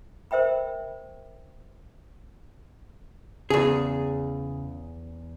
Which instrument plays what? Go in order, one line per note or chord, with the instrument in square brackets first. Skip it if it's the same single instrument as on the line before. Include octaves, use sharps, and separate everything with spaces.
[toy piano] A#4 C5 E5 G5 B5
[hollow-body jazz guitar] E2 G#4 [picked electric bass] C#3